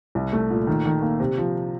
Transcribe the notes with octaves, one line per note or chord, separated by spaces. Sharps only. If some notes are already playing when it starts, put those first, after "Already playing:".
C2
A3
A#2
D#3
D#3
A#3
C3
F3